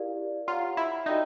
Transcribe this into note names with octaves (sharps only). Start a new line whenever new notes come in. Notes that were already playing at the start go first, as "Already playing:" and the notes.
Already playing: E4 G4 A#4 D5 F5
F4 C#5 F#5 A#5
E4
D#4 F#4 A4 D5 G5 B5